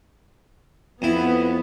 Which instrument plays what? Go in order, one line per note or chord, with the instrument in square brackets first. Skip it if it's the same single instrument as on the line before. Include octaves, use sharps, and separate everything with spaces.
[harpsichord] F2 E4 [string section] B3